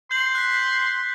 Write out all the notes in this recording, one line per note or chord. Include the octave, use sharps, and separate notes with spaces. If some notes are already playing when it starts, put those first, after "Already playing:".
C6 G6 F#7
F#6 B6